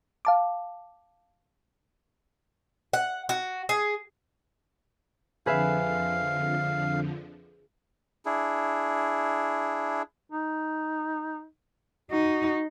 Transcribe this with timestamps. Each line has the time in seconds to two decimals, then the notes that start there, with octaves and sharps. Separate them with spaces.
0.25 F5 A5 D6
2.93 F#5
3.29 F#4
3.69 G#4
5.46 F2 D3 F3 G#4 B4 E5 F5
8.26 D4 E4 G#4
10.31 D#4
12.11 D#4 F#4